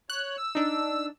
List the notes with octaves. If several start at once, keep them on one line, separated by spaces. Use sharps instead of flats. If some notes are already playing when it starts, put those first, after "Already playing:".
C#5 F#6
E6
D4 D#4